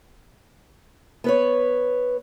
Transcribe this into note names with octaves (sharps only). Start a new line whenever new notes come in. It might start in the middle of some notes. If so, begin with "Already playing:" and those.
B3 B4 C#5